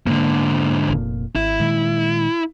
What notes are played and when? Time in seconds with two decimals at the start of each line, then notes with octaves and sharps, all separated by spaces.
0.07 G#2 D3 A#3
0.89 F1 A#2
1.36 G#1 E4
1.60 A#2 D#3 G#3